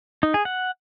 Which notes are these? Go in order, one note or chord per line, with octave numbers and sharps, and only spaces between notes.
D#4
G#4
F#5